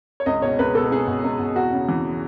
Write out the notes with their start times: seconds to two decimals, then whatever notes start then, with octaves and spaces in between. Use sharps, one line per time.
0.20 C#5
0.26 C#2 D#5
0.42 B2 C#5
0.59 C#2 B4
0.75 B2 A4
0.92 C#2 G#4
1.08 B2
1.24 C#2
1.40 B2
1.56 E2 F#4
1.73 C#3
1.89 E3